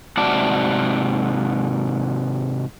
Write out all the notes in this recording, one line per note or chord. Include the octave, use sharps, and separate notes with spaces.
G#2 C3 F#4 D5 A5